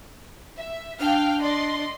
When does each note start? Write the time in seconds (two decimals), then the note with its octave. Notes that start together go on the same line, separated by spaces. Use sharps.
0.56 E5
1.00 D4 F5 G5 F6
1.42 D5 D#5 C6